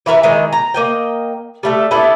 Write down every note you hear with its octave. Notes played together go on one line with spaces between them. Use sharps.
E3 E4 A#4 B4
D#3 E3 G#3 D#4
A#5
A#3 D#5 G5
G3 A3 A4
B3 D4 E4 A4